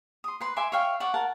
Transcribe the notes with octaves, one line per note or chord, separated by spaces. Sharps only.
C6 D#6
B4 C6
E5 G#5 C6 D6
C#5 E5 F5 G5
C#5 D5 F#5
A#4 F#5 A5